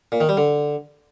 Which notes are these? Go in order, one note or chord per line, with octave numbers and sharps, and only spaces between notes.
A#2
D#3
G3
D3